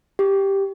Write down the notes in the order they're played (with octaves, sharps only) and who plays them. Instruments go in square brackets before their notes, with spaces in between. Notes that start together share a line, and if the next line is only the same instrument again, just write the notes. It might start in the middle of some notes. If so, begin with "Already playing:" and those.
[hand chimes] G4